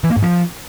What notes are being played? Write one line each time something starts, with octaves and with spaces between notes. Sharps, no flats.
E3
A#3
G#2
F3